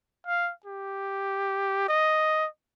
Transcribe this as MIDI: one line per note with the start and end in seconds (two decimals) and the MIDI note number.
0.27 0.52 77
0.65 1.88 67
1.88 2.47 75